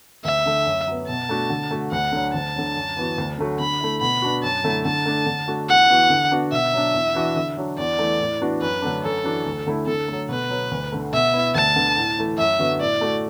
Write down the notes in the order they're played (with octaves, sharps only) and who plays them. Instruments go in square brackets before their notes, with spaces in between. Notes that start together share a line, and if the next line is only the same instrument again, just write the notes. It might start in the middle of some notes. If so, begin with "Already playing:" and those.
[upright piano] D2 [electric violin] E5
[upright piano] D3 A3
F#2
F#3 B3
[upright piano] B2 [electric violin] A5
[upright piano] A3 D4 F#4
D3
A3 F#4
[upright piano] D2 [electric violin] F#5
[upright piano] D3 F#3
[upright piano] D2 [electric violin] A5
[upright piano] D3 F#3
F#2
E3 B3 F#4
D2
D3 F#3 A3 F#4
[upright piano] D3 [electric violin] B5
[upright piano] A3 E4
[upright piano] B2 [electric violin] B5
[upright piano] B3 D4 F#4
[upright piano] F#2 [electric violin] A5
[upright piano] D3 F#3 A3 E4
[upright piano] D3 [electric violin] A5
[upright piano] A3 D4
D3
A3 D4 F#4
[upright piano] E2 [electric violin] F#5
[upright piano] E3 B3 F#4
D3
B3 D4 F#4
[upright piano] B2 [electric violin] E5
[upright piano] F#3 D4
E2
E3 D4 F#4
D3
F#3 D4 F#4
[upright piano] E2 [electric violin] D5
[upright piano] E3 A3
A2
E3 B3 D4 F#4
[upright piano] F#2 [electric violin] B4
[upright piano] D3 F#3 A3 D4
[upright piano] F#2 [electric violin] A4
[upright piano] E3 D4 F#4
D2
D3 A3 E4
[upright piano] D3 [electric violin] A4
[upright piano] F#3 A3
[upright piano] B2 [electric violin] B4
[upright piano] F#3 B3
D2
D3 A3
[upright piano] B2 [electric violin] E5
[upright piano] B3 E4
[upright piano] D2 [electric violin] A5
[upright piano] D3 B3
A2
E3 A3
[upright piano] F#2 [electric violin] E5
[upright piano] D3 B3 F#4
[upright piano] A2 [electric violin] D5
[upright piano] A3 F#4